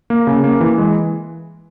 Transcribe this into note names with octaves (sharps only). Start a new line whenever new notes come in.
A#3
C#3
A#3
E3
G#3